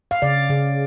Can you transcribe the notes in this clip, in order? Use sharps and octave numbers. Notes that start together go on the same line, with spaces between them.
F5
C#3 D5
C#3